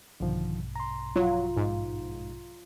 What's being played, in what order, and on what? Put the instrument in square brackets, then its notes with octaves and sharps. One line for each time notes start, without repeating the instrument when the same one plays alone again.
[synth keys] A#1 G2 B2 [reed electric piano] D3 D#3 F3
[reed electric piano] A#5 C6
[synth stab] F#3 [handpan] F4
[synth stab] G#2